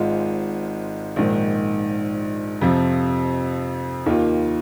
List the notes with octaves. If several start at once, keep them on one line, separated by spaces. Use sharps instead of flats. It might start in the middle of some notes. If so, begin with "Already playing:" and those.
Already playing: G#1 G#2 G#3 F4
A#1 G#2 D#3
F2 C3 F3
D#2 D#3 A#3 F4